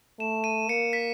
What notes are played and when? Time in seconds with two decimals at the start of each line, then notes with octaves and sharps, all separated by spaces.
0.20 A3 E7
0.44 D#7
0.68 A#3 C#7
0.93 B6